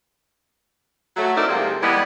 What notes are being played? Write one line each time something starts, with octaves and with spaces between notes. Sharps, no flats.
F#3 A3
C4 D#4 E4 A#4 D5
C3 F3 G3 G#3 A#3
E3 G3 G#3 B3